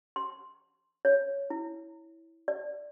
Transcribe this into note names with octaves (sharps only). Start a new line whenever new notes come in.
C6
C#5
E4
D5